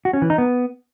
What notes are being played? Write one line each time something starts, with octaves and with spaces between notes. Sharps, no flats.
F#4
C#4
E3
D#4
B3